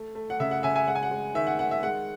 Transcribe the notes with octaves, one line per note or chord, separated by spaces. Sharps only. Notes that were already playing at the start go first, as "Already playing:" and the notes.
Already playing: A3
A3
F#5
C#3 E5
F#5
C#3 E5 G#5
E5 G#5
G#3 F#5
G#5
F#5
G#3
D#3 E5
F#5
D#3 F#5
E5
G#3 F#5